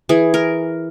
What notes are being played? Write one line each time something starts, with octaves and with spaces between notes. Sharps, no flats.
E3 G#4
A#4